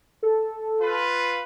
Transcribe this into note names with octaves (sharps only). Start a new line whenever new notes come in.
A4
F4 B4